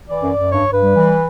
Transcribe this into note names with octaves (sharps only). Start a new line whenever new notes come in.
E3 D5
F#2
F#2
G2 C#5
G2
B4
G3
E3